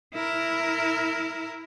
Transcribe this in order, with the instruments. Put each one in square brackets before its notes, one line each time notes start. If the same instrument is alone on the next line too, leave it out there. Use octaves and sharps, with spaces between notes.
[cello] E4 A#4